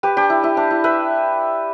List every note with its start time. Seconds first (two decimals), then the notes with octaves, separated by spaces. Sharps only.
0.03 G4 B4
0.17 D4 G4
0.30 E4
0.44 E4
0.57 D4
0.71 E4
0.84 B4 E5